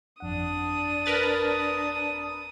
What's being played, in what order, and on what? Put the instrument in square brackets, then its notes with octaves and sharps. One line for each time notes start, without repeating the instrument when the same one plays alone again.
[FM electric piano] G1 F2 F#5 [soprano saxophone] D4 [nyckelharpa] D#6
[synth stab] A#4 B4 A6